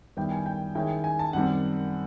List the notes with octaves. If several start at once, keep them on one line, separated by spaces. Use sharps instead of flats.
F#2 D#3 G3 B3 E4 G5
G#5
G5
D#3 G#3 C#4 E4 G5
G#5
A5
F#2 D#3 G3 C4 F#5